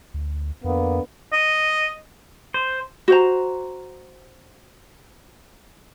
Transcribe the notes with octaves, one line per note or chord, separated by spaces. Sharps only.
D2
F2 D3 A#3 B3
D#5
C5
F#4 C5 A#5